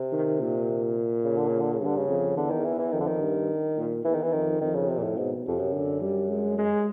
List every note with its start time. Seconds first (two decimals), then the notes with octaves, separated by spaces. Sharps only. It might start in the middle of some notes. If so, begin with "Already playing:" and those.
Already playing: C3
0.13 D#3
0.41 A#2
1.24 C#3
1.37 D3
1.49 C#3
1.60 D3
1.73 C#3
1.81 G2 D3
1.97 C#3
2.08 F2
2.37 E2 D3
2.51 D#3
2.65 E3
2.79 E3
2.93 F2 D#3
3.00 D3
3.08 D#3
3.21 G2
3.77 A#2
4.05 E2 E3
4.14 D#3
4.23 E3
4.33 F2 D#3
4.61 F2 D#3
4.75 C#3
4.89 C3
4.97 A#2
5.03 A2
5.17 G#2 B2
5.46 F2 C3
5.59 F#2
5.74 D3
6.02 G3
6.29 G#3
6.58 G#3